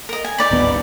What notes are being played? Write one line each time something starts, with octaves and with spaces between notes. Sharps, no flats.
A#4 D#5
G#5
D#4 D5 B5
D1 G#1 B3